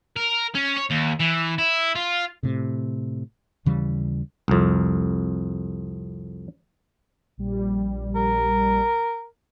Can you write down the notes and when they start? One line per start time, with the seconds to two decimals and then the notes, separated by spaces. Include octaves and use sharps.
0.16 A#4
0.55 C#4
0.77 C#5
0.91 D#2
1.20 E3
1.58 E4
1.95 F4
2.43 A2 C3
3.66 D#2 C#3 E3 G3
4.48 C2 F2
7.38 A#1 G3
8.15 A#4